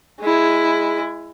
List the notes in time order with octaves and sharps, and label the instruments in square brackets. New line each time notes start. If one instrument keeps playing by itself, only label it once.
[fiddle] G#3 E4